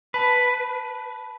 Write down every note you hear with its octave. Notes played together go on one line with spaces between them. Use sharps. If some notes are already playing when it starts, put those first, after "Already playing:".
B4 A5 B5